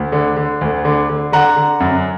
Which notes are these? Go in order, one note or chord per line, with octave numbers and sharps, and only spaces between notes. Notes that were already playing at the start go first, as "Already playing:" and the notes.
Already playing: D2
D3
D3
D2
D3
D3
D3 F#5 A#5
D3
F#2